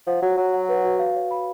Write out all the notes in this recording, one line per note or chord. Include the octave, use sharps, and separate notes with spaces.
F3 F#5
F#3 F#4
F#3 F#4
F#5
B4
F#4
F5
C#5
B5